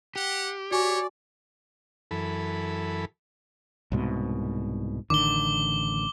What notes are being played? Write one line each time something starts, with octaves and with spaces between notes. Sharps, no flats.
G4 F#5
F#4 C#5 D5 G#5 C#6
F#2 E3 A4 B5
C2 G#2 B2
A1 D3 D#3 D6 G7